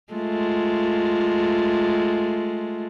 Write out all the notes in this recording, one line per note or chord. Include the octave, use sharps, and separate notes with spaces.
G#3 A3 F4